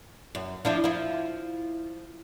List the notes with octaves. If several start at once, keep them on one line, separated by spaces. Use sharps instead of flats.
F#2
F3 D4 E4
F3 E4